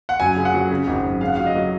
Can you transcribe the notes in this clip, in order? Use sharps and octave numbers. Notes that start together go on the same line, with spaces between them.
F#5
F#2 G#5
C#3
F#5
F#3
C#3
G#1
F#2
C#3 F5
F#5
F#3 F5
D#5
F#3